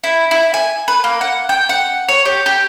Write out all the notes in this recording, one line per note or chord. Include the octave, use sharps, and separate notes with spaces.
E4
E4
G#5
B4
A#3
F#5
G5
F#5
C#5
G4
G4